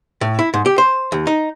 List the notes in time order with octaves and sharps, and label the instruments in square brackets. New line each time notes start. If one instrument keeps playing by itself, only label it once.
[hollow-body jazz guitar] A2
E4
G#2
G4
C5
D#2
D#4